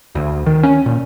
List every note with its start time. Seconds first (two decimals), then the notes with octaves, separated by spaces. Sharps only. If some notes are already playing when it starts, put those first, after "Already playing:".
0.15 D2
0.46 D#3
0.63 C#4
0.86 A#2